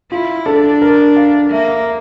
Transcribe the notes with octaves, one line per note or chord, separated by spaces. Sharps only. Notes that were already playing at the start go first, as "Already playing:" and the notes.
E4 F4
D4 A4
A#4
F5
A#3 E5
E5